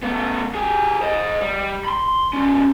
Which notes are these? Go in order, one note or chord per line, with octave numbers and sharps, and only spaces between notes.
A3 B3
G4 G#4
C5 D#5
G3
B5 C6
G3 C#4